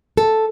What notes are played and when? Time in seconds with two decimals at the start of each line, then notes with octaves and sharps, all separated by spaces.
0.17 A4